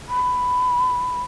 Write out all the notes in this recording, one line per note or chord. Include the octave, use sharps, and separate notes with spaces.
B5